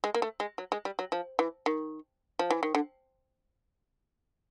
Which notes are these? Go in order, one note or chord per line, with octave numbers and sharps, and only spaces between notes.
G#3
A#3
A3
G#3
F#3
G#3
G3
F#3
F3
E3
D#3
F3
E3
D#3
D3